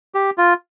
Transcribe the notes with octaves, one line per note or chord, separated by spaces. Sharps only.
G4
F4